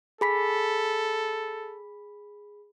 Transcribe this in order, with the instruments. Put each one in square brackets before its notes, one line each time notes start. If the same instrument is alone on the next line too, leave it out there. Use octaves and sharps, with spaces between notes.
[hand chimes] G#4 B5 B6 [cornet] A4